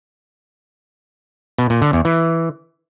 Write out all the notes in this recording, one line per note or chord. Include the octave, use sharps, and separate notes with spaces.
B2
A#2
D3
E2
E3